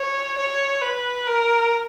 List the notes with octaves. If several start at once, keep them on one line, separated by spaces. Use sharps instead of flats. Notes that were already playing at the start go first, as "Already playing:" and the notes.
Already playing: C#5
C#5
B4
A#4